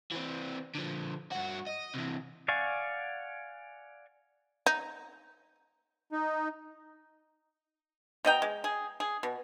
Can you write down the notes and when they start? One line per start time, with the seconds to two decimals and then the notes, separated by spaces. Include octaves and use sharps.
0.12 E3 C4
0.75 D3 F3
1.32 G2 F#4
1.67 D#5
1.94 C3 E3
2.48 D5 F5 F#5 G#5 C#6
4.66 D#4
6.12 D#4
8.25 B2 D#5 G5 A#5
8.42 G#3
8.64 G#4
9.00 G#4
9.23 B2